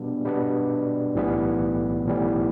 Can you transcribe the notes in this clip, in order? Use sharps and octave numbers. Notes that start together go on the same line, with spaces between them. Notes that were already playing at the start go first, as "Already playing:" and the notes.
Already playing: B2 G3 B3 D4
B2 G3 B3 D4
B1 A2 E3 G3 B3
B1 A2 E3 G3 B3